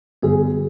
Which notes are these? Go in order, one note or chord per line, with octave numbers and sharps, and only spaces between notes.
G2 D3 G3 B3 G#4